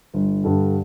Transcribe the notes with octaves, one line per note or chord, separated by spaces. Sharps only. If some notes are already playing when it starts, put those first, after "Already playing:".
G1
G2 D3 G3